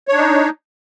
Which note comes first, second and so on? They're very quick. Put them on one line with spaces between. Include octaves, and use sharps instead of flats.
C#5 D4 D#4